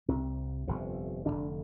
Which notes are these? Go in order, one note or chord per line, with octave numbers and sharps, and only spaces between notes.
C2 C3 C4
G1 F2 C3
F1 D#2 D3 D4